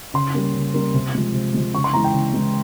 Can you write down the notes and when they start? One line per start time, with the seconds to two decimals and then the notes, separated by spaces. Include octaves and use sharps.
0.14 C#3 C6
0.34 G3 A#3 C#4
0.54 C#3
0.74 G3 A#3 C#4
0.94 C3
1.15 F3 G#3
1.34 C3
1.54 F3 G#3
1.74 C#3 C#6
1.84 C6
1.93 E3 G#3 E4 A#5
2.04 G5
2.14 C#3
2.33 E3 G#3 E4